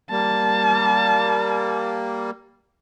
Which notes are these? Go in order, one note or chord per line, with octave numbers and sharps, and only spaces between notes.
G3 A#3 A5